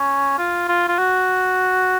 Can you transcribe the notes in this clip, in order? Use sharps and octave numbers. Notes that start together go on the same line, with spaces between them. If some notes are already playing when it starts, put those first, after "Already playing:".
Already playing: C#4
F4
F4
F4
F#4